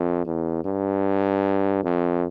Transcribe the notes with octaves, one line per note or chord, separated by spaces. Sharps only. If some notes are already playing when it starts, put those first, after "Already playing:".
Already playing: F2
E2
G2
F2